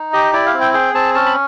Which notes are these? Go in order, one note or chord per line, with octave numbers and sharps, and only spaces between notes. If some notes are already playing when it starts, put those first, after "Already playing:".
Already playing: D#4
G4 D#5
E4 D5
F5
C4
G5
G#4 G5
C4 A5
C#4 A5
B5